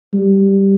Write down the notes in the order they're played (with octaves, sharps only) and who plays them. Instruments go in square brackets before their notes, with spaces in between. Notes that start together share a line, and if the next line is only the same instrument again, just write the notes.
[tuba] G3